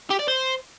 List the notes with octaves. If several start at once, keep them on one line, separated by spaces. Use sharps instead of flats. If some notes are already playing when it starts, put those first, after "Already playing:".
G4
D5
C5